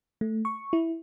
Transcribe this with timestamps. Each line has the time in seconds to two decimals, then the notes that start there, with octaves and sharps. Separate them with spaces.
0.21 A3
0.45 C#6
0.73 E4